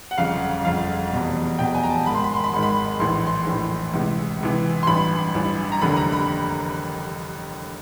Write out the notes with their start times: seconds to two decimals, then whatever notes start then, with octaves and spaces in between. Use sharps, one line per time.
0.11 F#5
0.18 G1 F2 C#3 F5
0.65 G1 F2 C#3 F5
1.12 F1 E2 B2
1.58 F1 E2 B2 G5
1.75 G#5
1.83 A#5
1.90 A5
2.05 G#1 G#2 D#3 B5
2.15 C6
2.24 B5
2.34 C6
2.44 B5
2.53 G#1 G#2 D#3 C6
2.63 B5
3.00 A#1 A2 E3 C6
3.27 C6
3.46 A#1 A2 E3
3.93 C#2 C3 E3
4.40 C#2 C3 E3
4.83 C6
4.87 A1 G2 E3 B5
5.34 A1 G2 E3
5.72 A#5
5.81 F1 D#2 D3 B5
5.97 A#5
6.12 B5